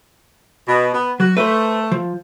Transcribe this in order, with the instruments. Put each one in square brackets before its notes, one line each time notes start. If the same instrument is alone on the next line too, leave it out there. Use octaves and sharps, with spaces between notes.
[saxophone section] B2
B3
[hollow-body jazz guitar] F#3 [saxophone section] F#4
[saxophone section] A3 [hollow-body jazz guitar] B4 C5
[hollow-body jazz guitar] F3